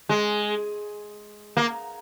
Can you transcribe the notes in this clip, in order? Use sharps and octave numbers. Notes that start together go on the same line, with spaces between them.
G#3
A#3